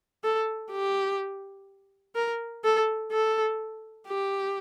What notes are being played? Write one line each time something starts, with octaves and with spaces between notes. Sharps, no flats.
A4
G4
A#4
A4
A4
G4